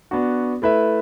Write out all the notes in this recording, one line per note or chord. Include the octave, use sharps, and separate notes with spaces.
B3 D4 F#4
A3 E4 B4 E5